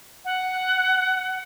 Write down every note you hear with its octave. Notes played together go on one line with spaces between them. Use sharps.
F#5